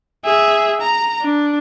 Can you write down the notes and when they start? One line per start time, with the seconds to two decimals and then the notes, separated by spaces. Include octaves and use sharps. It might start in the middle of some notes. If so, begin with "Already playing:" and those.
0.25 G#4 E5
0.81 A#5
1.21 D4